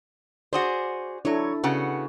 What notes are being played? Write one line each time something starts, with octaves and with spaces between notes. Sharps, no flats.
F#4 G#4 C5 D5
F#3 D4 E4 A4 C#5
C#3 B3 F#4